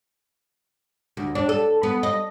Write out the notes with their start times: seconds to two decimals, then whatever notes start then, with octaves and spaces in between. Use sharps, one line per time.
1.17 D2
1.35 D4
1.49 A4
1.83 B3
2.03 D#5